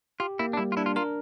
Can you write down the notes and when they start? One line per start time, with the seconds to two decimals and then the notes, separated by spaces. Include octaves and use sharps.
0.20 F4 G4
0.39 A#3 E4
0.53 D4
0.57 G3 E4
0.72 F4
0.77 D4 E4
0.86 F4
0.96 F4 A#4